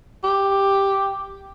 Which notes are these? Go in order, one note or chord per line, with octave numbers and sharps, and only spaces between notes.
G4